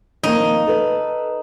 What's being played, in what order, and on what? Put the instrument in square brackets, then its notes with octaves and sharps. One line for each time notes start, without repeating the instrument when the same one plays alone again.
[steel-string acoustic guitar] F2 D#3 A#3 [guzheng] D#4
[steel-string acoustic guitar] A4 B4